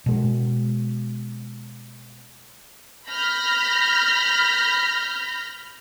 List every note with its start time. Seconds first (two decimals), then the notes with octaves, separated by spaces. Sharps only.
0.06 B2 G#3
3.09 B5 F6 G6 A#6 B6